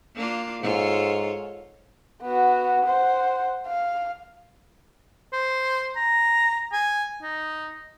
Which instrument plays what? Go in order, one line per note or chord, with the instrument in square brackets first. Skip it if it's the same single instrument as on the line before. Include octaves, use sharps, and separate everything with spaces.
[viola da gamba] A#3 D4 F4
[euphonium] G#2 [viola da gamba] F4 A4 C#5
[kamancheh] B3 F#4
C5 F#5
F5
[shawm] C5
A#5
G#5
D#4